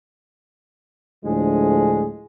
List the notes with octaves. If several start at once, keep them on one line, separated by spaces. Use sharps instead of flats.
D2 A2 F3 G#3 D4 G#4